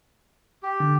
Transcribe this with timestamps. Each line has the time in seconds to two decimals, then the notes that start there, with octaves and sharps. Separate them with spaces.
0.63 G4
0.80 D3